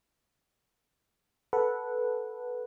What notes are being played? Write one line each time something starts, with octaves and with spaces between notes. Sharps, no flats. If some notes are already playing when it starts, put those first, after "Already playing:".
A4 B4 F#5